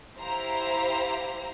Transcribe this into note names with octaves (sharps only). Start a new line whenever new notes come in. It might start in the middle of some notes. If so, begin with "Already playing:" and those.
E4 G4 C5 F5 A#5